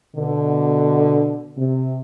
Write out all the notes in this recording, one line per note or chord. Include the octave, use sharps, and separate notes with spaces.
B2 D3
C3